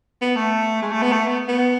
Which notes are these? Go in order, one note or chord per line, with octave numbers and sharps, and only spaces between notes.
B3
A3
G#3
A3
B3
A3
B3
B3